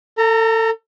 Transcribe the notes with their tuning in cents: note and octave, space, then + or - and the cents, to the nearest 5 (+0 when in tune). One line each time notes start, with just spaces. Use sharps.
A4 +30 A#5 -15